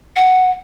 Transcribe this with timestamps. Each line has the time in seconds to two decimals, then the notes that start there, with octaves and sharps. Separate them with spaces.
0.16 F#5